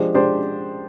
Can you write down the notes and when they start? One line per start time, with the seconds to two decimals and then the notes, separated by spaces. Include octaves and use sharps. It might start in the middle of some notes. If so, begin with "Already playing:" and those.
Already playing: F3 G#3 D4 G4 C5
0.14 F3 G#3 D4 G4 C5